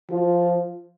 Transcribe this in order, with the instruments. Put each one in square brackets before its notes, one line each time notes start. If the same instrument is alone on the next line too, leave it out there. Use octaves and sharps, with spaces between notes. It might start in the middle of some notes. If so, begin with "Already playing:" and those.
[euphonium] F3 [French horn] F4